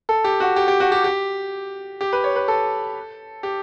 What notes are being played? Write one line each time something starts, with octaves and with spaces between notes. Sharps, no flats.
A4
G4
F#4
G4
G4
F#4
G4
G4
G4
B4
C#5
B4
A4
G4